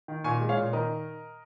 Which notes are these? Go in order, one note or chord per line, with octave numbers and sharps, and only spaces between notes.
D#3
A#2 G#5 C#6
G#3
C#5 F5
A#2
D#3 A#4 D#5